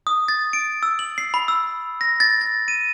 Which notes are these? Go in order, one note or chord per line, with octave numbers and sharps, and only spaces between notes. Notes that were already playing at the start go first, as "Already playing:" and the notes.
D#6
A6
D7
E6
F#7
C7
B5
E6
A#6
A6
A6
D#7